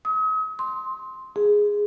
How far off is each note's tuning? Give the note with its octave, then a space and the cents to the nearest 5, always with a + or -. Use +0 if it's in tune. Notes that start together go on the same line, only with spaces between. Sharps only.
D#6 +45
C6 +0
G#4 -5